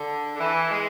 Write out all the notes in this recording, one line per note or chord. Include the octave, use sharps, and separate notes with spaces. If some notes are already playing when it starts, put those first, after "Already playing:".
Already playing: D3
D3
E3
G#3